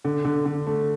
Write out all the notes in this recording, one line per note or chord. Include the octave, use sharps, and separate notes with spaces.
D3
D3
D3
A3